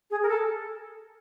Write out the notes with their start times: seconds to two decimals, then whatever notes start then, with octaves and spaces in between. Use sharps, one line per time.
0.11 G#4
0.23 A#4
0.28 A4